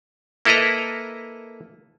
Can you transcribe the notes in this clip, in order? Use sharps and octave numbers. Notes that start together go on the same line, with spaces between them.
A#3 E4 A4 B4 D#5 A#5